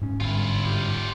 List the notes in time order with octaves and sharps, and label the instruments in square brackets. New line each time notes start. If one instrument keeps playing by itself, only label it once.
[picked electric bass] G#2 C#4
[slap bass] G1 [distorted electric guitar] E4 F4
[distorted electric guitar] F4 G4